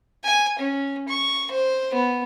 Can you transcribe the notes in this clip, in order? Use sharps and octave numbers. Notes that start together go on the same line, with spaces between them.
G#5
C#4
C#6
C5
B3